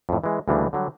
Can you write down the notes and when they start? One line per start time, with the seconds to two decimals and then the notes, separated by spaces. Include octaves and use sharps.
0.09 F2 A2
0.24 E3 G#3
0.48 D2 C#3 E3 G3 G#3 D4
0.73 D3 F#3 G3